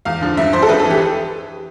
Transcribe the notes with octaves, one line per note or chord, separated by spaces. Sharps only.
E2 F5
D3 F3
G2 E5
F3 C5
A4
F2 B4
A4
E3
G4